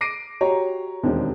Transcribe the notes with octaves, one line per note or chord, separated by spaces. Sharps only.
D6 A#6 C7 D7 D#7
F#4 G4 C#5 A#5
E1 D#2 G#3 C4 D4